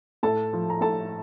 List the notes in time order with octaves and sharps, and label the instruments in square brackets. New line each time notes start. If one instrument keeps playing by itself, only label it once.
[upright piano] A2 A4 A5
F3
A#5
A2 A4 A5